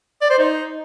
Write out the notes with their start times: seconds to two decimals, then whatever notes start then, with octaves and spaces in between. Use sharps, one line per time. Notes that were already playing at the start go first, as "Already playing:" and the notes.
0.21 D5
0.30 C5
0.39 D#4